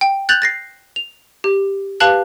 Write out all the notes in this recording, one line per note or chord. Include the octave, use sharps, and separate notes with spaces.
G5
F#6 G6 A6 F7 F#7
A6 A#6 C7
F7
G4
G4 B4 F5 A5 F#6 F#7